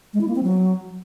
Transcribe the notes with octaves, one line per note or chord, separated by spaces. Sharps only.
G#3
E4
A#3
C4
F#3